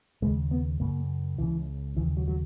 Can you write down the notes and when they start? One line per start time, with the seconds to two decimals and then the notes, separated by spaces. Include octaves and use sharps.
0.22 D#2 C#3 G#3
0.51 B3
0.80 F#2 C#3 A#3
1.38 C#2 C#3 E3
1.97 D#2 C#3 E3
2.17 F#3
2.28 F#3